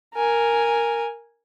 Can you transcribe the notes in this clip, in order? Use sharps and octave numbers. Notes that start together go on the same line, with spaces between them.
A#4 G#5